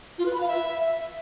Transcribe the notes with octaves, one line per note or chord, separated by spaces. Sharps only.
F4
B4
B5
F5
E5